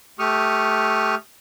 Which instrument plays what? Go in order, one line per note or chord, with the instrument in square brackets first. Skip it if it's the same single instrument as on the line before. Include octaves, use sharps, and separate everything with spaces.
[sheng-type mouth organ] A3 G4 C#6 D#6 F6